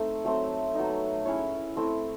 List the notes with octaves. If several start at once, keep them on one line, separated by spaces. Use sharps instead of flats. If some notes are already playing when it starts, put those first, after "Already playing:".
Already playing: A3 C4 D#4
F#3 A3 C4
F#3 B3 D#4
C#4 E4 G#4 C#5
A3 C4 E4